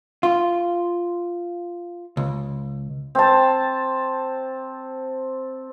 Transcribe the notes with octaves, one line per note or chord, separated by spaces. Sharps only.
F4
C#2
C4 A5